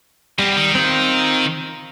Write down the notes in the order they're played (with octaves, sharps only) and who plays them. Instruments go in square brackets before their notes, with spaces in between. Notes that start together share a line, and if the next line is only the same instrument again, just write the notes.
[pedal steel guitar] G3 [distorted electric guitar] B3 C4
[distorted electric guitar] D#3
[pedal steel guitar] C4 F4